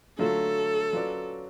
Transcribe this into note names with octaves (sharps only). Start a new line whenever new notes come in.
D3 F#3 A3 F4 A4
F#3 C#4 F4 B4 D5